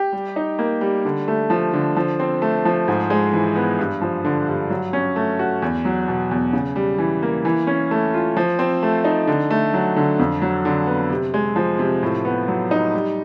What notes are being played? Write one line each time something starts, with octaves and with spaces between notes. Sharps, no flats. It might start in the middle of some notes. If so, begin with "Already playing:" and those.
Already playing: G4
G3
D#4
A#3
G3
D3
A3
F3
D3
F3
C4
A3
F3
G#2
G#3
E3
B3
G2
F3
D3
G2
F#3
C#4
A3
F#4
E2
F#3
B2
E2
C#3
G3
E3
A#3
E3
C#4
A3
F4
F3
C4
A3
D#4
D3
A3
F#3
D3
F2
F#3
D3
B3
C3
G#3
F3
C3
A2
B3
F#3
D#4
G3